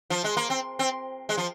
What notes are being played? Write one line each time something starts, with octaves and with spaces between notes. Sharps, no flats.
F3
G#3
A#3
C4
C4
G#3
F3